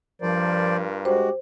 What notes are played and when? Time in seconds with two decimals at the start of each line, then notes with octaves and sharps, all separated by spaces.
0.22 G2 F3 F4 A#4 C5 D5
1.05 G#3 F#4 G4 C5